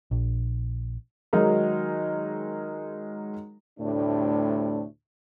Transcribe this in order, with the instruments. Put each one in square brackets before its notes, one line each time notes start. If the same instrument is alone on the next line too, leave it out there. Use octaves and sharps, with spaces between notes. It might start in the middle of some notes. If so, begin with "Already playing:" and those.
[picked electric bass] A#1
[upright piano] D#3 F#3 G#3 D#4 G#4 A#4
[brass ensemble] D2 A2 C3 G3 A3 D4